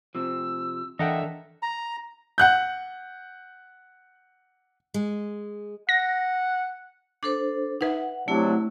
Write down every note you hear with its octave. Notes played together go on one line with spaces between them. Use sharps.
C3 F3 E6
E3 D4 A4 A#4 D#5 E5 F#5 G5
A#5
F#5 F#6 G6
G#3
F#5 A#6
D4 A4 C5 D6
D#4 B4 E5 F#5
C3 F#3 A3 D4 E4